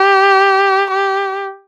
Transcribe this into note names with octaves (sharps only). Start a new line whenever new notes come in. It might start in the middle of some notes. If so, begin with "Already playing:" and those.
Already playing: G4
G4